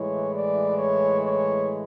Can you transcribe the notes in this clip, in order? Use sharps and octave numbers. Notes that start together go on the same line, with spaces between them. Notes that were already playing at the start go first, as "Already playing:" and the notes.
Already playing: A2 E3 G#3 C#5
D5
C#5
C#5